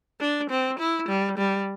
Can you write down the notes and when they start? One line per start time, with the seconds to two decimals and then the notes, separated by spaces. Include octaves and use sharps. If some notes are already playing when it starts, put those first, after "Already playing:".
0.20 D4
0.50 C4
0.79 E4
1.09 G3
1.38 G3